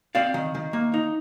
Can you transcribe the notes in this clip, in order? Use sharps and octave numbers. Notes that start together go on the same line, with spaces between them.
C4 D5 F5
D#3
D#3
A#3
D#4